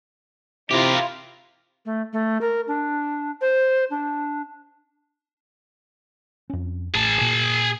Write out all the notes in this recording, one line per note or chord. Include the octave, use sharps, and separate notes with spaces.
C3 E4 F4 G4 A#4
A3
A3
A#4
D4
C5
D4
F2 C#4
A1 G#4 A5
A#2